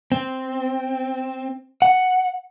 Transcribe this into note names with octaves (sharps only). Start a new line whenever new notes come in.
C4
F#5